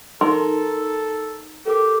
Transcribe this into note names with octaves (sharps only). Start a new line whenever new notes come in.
D#4 A4 A#4 C6
G4 A4 A#4 D6